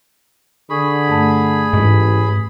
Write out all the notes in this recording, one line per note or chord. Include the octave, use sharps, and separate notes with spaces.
D3 G#4 B5 C#6
G2 A3 A5
A1 G#2